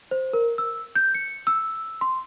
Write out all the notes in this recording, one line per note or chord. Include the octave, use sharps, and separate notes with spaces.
C5
A#4
E6
G6
C#7
E6
C6